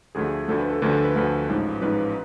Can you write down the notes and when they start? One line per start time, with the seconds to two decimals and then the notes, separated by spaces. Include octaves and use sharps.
0.15 D2 D3 F3 A3 G#4
0.48 D2 D3 F3 A3 A4
0.59 B4
0.70 A4
0.82 D2 D3 F3 A3 B4
0.92 A4
1.04 B4
1.15 D2 D3 F3 A3
1.49 A1 G#2 F3
1.82 A1 G#2 F3 B4